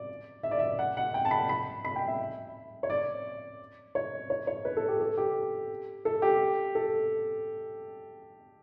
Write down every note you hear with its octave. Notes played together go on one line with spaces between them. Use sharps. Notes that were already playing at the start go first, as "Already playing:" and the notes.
Already playing: D5
E5
D5
E5
F#5
F#5
G5
A5
B5
B5
B5
G5
E5
C#5
D5
C#5
C#5
C#5
B4
A4
G4
A4
G4
A4
G4
A4